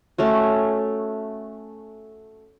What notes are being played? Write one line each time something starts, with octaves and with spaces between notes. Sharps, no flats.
A3 C#4 F#4